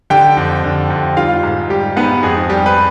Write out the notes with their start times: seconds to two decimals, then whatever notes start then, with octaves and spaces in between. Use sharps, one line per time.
0.10 D3 G4 G5
0.37 F2
0.64 D3
0.90 F2
1.17 G3 F4 F5
1.43 G#2
1.70 G3 G4
1.96 G#2 B3 B4
2.23 F2 G#4
2.49 G3 G4
2.66 B4